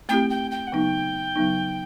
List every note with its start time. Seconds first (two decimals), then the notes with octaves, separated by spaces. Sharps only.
0.09 A3 C4 E4 G4 G5
0.30 G5
0.51 G5
0.67 F#5
0.72 C#3 F#3 B3 D#4 G5
1.36 C#3 F#3 B3 D#4